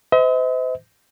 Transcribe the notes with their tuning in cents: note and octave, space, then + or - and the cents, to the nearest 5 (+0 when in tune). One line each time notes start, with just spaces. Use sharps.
C5 -40 D#5 +45